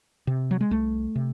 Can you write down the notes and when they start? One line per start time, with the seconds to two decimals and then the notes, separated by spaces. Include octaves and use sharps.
0.27 C3
0.51 F#3
0.61 G#3
0.71 C2 A3
1.15 C3